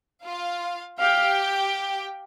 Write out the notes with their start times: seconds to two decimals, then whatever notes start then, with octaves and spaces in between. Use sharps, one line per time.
0.25 F4 F5
0.99 G4 F5 G5